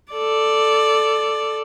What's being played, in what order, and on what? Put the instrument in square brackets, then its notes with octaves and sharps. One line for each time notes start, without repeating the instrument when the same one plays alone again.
[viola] A4 D5